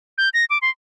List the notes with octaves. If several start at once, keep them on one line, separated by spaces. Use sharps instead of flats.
G6
A#6
D6
C6